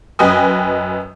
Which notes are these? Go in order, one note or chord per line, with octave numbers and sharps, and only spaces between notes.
F#2 B4 D#5 G5 G#5 D#6